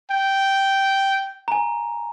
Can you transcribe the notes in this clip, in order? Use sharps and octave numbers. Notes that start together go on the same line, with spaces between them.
G5
G#5 A#5